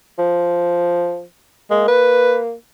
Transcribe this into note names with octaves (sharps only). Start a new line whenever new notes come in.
F3
G#3 A#3
B4